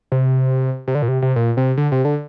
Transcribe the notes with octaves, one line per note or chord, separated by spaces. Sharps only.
C3
C3
D3
A#2
C3
C3
A#2
C3
D3
C3
D3